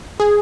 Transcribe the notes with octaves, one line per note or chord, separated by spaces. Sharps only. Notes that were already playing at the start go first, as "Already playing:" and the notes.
G#4